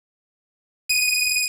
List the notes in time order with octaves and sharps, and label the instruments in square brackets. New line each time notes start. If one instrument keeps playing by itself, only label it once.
[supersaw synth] D#7